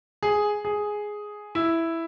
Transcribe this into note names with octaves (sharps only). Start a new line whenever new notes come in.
G#4
G#4
E4